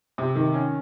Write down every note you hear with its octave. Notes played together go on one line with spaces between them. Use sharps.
C3
D#3
C#4